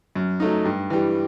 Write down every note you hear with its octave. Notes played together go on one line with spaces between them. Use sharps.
F#2
F#3 A3 D#4
G2
E3 G3